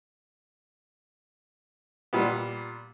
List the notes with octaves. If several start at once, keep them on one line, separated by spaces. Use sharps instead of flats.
A#2 G3 B3